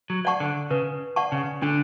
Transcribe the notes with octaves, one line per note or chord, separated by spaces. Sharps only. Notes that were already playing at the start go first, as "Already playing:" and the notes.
F#3
D5 F#5 A5 C#6
D3
C#3 B4
D5 F#5 A5 C#6
C#3
D3 D4